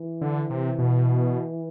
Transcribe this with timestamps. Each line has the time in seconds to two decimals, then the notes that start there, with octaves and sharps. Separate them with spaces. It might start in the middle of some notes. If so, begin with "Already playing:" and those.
Already playing: E3
0.21 D3
0.50 C3
0.79 B2